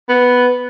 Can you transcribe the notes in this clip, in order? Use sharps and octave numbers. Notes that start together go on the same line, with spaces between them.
B3